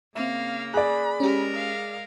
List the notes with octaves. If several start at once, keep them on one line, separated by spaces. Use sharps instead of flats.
C#3 A#3 C4 E5 F5
G#4 D5 B5 F#6
G#3 C#4 G4 A#4
F5